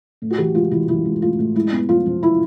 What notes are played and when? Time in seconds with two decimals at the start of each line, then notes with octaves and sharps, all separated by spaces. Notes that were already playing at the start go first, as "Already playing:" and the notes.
0.22 A2
0.30 F#4
0.38 E3 G4
0.55 G#3 F4
0.71 E3 E4
0.88 E3 E4
1.05 G#3
1.21 A2 F4
1.39 A2
1.55 G#3 E4
1.72 B3
1.89 F3 F4
2.06 F3
2.23 E4